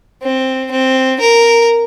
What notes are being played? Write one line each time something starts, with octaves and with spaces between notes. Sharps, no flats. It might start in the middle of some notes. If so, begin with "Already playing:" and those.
C4
C4
A#4